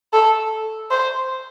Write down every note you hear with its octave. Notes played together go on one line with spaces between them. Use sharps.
A4
C5